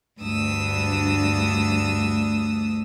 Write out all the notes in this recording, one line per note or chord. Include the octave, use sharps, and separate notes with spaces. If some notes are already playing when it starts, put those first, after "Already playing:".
D2 G2 A3 D4 D#6 E6